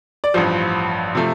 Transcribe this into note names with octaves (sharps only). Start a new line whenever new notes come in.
D5
A1 G2 F3 C5
C3 F3 A3